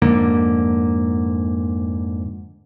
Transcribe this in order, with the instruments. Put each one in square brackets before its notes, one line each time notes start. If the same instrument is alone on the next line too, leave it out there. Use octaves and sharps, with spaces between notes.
[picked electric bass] F2 G#2 D3 A#3